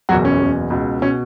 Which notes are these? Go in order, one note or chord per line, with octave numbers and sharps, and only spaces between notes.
F#1 E2 B2 F#3 F#4
C#4
F#1 E2 B2
C#2 B2
B2 C#4